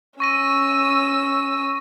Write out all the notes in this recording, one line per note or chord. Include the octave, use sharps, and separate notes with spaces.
C#4 C#6 E6 A#6 D#7